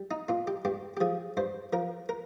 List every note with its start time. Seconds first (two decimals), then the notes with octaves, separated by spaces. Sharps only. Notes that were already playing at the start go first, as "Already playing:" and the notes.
Already playing: G3
0.11 D#4
0.29 A#2 F4
0.47 G4
0.65 G2 G4
0.97 G4
1.01 F3 G#4
1.37 G2 C5
1.73 F3 A#4
2.09 A#4